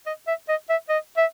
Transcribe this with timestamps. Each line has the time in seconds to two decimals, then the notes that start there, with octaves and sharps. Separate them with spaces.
0.06 D#5
0.27 E5
0.49 D#5
0.69 E5
0.89 D#5
1.17 E5